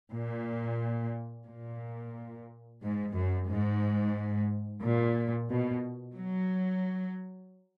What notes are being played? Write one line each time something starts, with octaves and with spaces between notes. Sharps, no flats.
A#2
A#2
G#2
F#2
G#2
A#2
B2
F#3